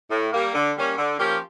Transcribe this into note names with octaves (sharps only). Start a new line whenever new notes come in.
A2
G3 A#3
D3
G3 A#3 C#4
D3
F3 A#3 C#4 G4